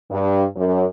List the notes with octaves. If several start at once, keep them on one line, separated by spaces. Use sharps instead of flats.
G2
F#2